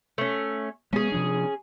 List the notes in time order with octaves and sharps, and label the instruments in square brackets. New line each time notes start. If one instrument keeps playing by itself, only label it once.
[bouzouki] A3 C#4
[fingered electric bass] G#3 B3 [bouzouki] C#4 G#4
[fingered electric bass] C3 F3 D4